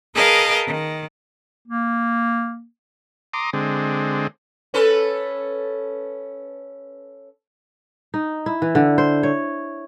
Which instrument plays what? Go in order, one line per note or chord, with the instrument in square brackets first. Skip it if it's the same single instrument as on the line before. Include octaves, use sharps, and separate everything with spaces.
[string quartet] G#4 A#4 B4 D#5 F5 A5
D#3
[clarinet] A#3
[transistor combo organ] A#5 C6 D6 D#6
D3 G#3 C4
[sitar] C#4 A4 B4
[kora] D#4
E4
E3
D3
C5
C#5